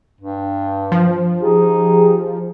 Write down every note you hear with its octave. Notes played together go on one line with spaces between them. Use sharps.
G2
F3
D#4 G4 G#4